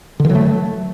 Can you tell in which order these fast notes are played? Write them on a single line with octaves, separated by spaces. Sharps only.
D3 D#3 F#3 A3